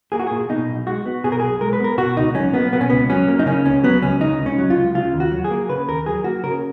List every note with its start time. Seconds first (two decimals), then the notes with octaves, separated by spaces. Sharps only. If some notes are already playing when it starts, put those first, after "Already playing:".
0.12 A#3 G#4
0.19 F#4
0.27 A#2 G#4
0.49 B2 D#4
0.68 B1
0.87 G#3 F#4
1.06 B3
1.24 B2 G#4
1.32 A#4
1.40 B1 G#4
1.61 G#3 A#4
1.73 B4
1.80 B3 A#4
1.98 B2 F#4
2.17 C#2 D#4
2.35 F#3 C#4
2.53 A#3 B3
2.72 B2 B3
2.81 C#4
2.90 C#2 B3
3.10 F#3 C#4
3.28 A#3
3.39 D#4
3.46 C#3 C#4
3.65 C#2 C#4
3.84 F#3 B3
4.02 C#2 C#4
4.21 C#3 D#4
4.39 C#2
4.46 C#4
4.58 F#3
4.70 F4
4.77 C#2
4.95 C#3 F4
5.13 D#2
5.20 F#4
5.32 F#3
5.44 G#4
5.51 A#3
5.69 C#3 B4
5.88 D#2 A#4
6.06 F#3 G#4
6.24 A#3 F#4
6.44 C#3 A#4